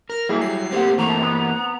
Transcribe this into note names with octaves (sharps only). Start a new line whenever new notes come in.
A#4 F6
F#3 G3 A#3 E4 G#4
C7
A3 A#3 C4 G4 C5 F#5
E3 A3 A#3 A#5
B3